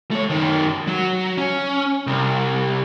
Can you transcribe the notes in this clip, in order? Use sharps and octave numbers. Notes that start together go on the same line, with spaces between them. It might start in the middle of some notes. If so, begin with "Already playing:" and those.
A3 C#5
F#2 D#3
F#3
C#4
C2